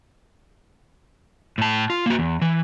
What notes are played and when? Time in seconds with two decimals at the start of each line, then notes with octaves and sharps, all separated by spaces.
1.58 A2 A5
1.90 F4
2.06 A#3 F#4
2.19 E2
2.42 E3